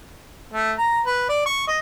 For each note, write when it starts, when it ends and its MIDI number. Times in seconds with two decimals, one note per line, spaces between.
0.53 0.73 57
0.78 1.01 82
1.06 1.26 71
1.29 1.44 74
1.46 1.66 85
1.68 1.79 75